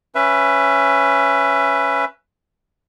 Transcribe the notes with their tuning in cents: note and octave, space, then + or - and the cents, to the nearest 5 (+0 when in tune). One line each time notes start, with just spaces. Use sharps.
C#4 +0 B4 +0 E5 +20